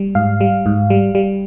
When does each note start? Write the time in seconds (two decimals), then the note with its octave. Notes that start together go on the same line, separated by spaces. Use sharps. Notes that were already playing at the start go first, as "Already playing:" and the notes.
Already playing: G3
0.15 G#2 F5
0.41 G3
0.66 G#2
0.90 G3
1.15 G3